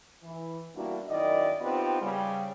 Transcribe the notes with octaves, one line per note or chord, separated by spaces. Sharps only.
E3
G3 A#3 B3 D4 E4 F#4
F#2 D#3 E4 D5 D#5
B3 C4 D#4 F4 G4 B4
C#3 G3